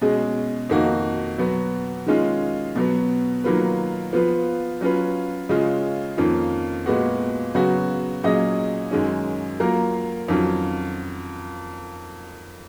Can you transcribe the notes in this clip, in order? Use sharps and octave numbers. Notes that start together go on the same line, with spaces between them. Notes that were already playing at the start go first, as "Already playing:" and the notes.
B2 G#3 C#4 G#4
F2 D#3 A#3 D#4 F#4
B2 F#3 B3 F#4
D#3 G#3 C#4 F4
B2 F#3 B3
D#3 F#3 A#3 F4 B4
F3 B3 F4 B4
F#3 C#4 F4 B4
C#3 G#3 C#4 F4
F2 D#3 A#3 C#4 F4
A#2 G#3 B3 F#4
C#3 F#3 B3 F#4
A#2 F#3 C#4 G#4 D#5
F#2 D#3 G#3 C#4
F#3 A#3 F4 A#4
F2 D#3 F#3 C#4 F4